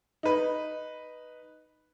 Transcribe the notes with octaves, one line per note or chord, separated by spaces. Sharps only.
D#4 B4